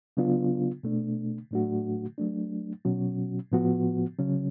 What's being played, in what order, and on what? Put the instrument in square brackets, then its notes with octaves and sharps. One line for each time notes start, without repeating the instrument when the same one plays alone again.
[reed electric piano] C#3 F#3 B3 D4 F4
B2 A3 D4
A2 F#3 A3 D4 F#4
F#3 A3 D4
B2 F#3 C#4 F#4
A2 F3 B3 F#4
C#3 F#3 C#4